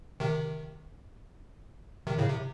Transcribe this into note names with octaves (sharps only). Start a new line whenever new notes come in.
C3 D#3
C3 D#3
A2 C#3
C3